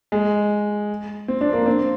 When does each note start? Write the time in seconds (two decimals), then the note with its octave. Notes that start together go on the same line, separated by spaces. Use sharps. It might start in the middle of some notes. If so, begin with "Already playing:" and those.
0.12 G#3
1.28 C4
1.41 D4
1.53 A#3
1.66 C4